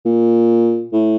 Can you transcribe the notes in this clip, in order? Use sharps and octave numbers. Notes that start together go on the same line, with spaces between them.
A#2
A2